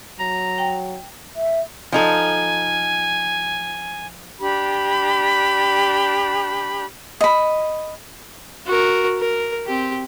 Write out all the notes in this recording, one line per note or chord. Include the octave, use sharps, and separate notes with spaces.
F#3 A#5
G5
E5
F3 D#4 A4 G#5
D4 G4 B5
D#5 B5
F#4 A#4
A#4
C4 G4